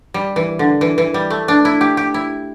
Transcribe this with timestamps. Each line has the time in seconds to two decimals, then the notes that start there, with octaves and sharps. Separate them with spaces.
0.14 G3
0.36 E3
0.59 D3
0.81 E3
0.98 E3
1.14 G3
1.30 A3
1.48 D4
1.65 E4
1.81 G4
1.97 G4
2.14 E4